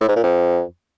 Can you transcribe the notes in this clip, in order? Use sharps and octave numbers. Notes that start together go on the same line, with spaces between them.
A2
G#2
A#2
F2